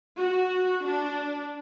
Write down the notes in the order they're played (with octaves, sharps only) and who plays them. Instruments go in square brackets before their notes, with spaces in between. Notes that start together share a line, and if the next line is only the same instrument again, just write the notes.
[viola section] F#4
D4